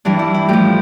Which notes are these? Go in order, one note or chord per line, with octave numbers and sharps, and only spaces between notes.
G2 E3 G3 D4
E4
E4
A2 F3 G4